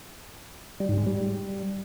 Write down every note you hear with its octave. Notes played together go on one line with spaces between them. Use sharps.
G3
G#2
G#3
G3